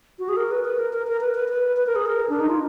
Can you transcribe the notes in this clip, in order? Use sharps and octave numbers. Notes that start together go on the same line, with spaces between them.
F#4
G#4
A#4
B4
B4
A#4
A#4
A#4
B4
B4
B4
B4
A#4
G#4
A#4
D4
D#4
F4